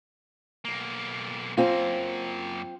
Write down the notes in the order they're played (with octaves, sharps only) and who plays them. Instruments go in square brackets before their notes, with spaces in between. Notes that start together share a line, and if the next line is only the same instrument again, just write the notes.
[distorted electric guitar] B1 A#3
[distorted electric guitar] F#2 A#3 [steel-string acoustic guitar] C4 F4